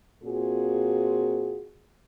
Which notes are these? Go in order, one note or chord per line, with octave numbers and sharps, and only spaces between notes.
A#2 C4 F4 F#4 G#4